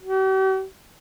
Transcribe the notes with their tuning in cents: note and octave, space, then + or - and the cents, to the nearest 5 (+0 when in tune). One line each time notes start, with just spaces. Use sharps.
G4 -45